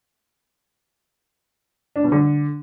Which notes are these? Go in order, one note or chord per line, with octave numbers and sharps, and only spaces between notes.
D4
B2
D3